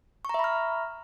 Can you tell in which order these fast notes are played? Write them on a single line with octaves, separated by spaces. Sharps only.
C#6 A#5 E5 B5 F6